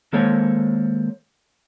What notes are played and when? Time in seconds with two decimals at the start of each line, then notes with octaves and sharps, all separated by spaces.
0.13 D#3 G#3 A#3 A4 C5 C#5